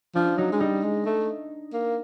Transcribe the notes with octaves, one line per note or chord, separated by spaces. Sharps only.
F3 D4
F#3 D#4
G#3
G3 D#4
G#3
A3
A#3